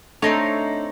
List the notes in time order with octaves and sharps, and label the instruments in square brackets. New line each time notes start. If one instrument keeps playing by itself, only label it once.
[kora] A3 [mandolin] C4 D#4 C#5 [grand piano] D4 C6 C7